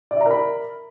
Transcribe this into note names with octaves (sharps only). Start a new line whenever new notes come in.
A#4 D5 E5 A#5 B5